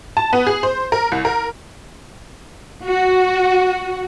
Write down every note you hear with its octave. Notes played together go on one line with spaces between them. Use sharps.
A5
B3
G#4
C5
A#4
C2
A#4
F#4